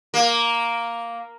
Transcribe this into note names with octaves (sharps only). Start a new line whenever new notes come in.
A#3